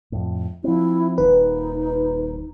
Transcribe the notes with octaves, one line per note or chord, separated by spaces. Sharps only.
F2 A2
F3 C4 E4
D#1 D#3 D#4 B4